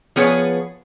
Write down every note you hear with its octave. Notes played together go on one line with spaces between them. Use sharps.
F3 B3 G#4 B4 C#5